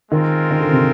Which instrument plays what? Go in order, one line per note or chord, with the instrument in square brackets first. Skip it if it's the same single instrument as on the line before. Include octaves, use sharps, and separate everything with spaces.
[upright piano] D#3 [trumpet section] G#3 C4 F4 A#4
[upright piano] D#3
D3
C3